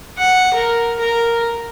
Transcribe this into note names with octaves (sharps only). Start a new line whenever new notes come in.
F#5
A#4
A#4